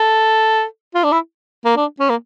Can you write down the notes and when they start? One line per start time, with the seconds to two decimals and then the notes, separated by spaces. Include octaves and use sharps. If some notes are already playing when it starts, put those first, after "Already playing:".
Already playing: A4
0.95 F4
1.04 D4
1.12 E4
1.65 A#3
1.77 D4
2.00 C#4
2.09 A#3